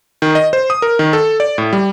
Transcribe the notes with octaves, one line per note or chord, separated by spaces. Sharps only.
D#3
D#5
C5
D#6
A#4
D#3
A4
D5
A2
G3